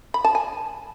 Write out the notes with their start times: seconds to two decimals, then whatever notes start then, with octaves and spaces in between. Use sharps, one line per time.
0.14 B5
0.24 A5
0.35 G#5